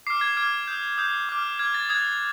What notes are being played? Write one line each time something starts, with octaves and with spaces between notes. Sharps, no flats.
D6 F6 C7
G#6
D6 F6 G#6
D#6 G6
D#6 G6
D6 F6
D6 F6 G#6
A6
D#6 F#6 G#6